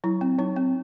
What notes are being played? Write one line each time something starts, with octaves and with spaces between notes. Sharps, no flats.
F#3 E4
C4
F#3 D#4
C4